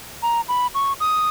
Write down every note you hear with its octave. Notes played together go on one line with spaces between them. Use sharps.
A#5
B5
C#6
D#6